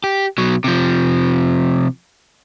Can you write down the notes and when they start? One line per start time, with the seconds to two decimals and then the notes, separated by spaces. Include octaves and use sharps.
0.04 G4
0.38 B2 F#3
0.64 C3 F3